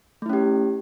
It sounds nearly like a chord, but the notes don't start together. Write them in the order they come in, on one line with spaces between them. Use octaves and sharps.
A3 E4 C#4 G4